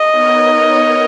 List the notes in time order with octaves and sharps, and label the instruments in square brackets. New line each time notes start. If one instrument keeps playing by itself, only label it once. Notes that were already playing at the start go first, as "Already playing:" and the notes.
Already playing: [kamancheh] D#5
[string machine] B3 D#4 A#4 C#5